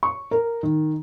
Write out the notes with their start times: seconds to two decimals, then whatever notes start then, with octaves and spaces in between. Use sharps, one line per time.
0.03 C#6
0.31 A#4
0.63 D#3